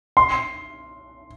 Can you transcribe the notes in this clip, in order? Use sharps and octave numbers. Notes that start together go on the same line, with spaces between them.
C6